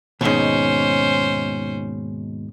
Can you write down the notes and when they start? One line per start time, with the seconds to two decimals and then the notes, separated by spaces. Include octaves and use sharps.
0.21 D#2 G#2 B2 B3 C#4 D#4 C5